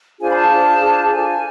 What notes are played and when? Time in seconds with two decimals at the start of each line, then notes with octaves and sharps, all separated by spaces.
0.20 D4 F4 G#4 C5 G#5
0.31 B5
0.35 A5
0.50 D4 F4 G#4 C5
0.80 D4 F4 G#4 C5
1.10 D4 F4 A4 C5 G#5